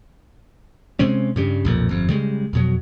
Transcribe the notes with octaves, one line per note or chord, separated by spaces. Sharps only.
C3 G#3 C4 C#4
G2 C#3 G3
B1 F2 A#2
G1 F2
C#3 G3 G#3
F2 B2 F#3